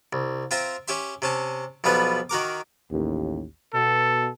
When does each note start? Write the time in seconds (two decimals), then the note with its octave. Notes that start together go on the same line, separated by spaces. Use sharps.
0.13 C2
0.51 C4 F4 E5 G5 A#5 C6
0.88 C#4 G4 E5 C6
1.22 C3 C#4 A5
1.84 B1 F3 G3 B3 B4
2.29 D#3 F#4 A#4 D6
2.90 A1 D#2
3.73 B2 A4